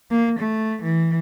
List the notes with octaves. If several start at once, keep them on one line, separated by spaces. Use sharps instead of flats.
A#3
A3
E3